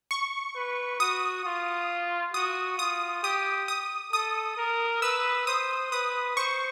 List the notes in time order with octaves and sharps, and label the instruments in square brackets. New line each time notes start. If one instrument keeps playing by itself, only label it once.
[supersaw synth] C#6
[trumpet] B4
[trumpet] F#4 [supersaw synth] D#6
[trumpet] F4
[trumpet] F#4 [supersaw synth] D#6
[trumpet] F4 [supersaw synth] D#6
[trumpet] G4 [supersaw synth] D#6
[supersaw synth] D#6
[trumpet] A4 [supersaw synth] D#6
[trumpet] A#4
[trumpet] B4 [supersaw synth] E6
[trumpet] C5 [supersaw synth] D#6
[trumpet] B4 [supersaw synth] D#6
[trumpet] C5 [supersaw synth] C#6